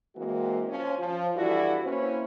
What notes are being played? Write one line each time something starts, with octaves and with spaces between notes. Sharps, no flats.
E3 G#3 A#3 C4 F#4
F3 C#4
F3
G2 E3 E4 F#4 A4 D5
A#3 C4 C#4 E4 B4 C5